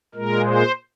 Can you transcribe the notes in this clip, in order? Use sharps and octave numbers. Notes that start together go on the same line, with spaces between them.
A#2 G#3 A#4
C5